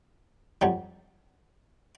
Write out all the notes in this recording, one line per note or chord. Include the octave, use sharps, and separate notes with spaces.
F2 F#3 G3